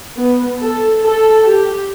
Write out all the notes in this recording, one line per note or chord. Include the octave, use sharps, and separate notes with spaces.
B3
A4
A4
G4